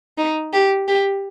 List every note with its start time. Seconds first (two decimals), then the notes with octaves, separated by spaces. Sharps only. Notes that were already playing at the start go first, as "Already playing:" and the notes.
0.18 D#4
0.53 G4
0.88 G4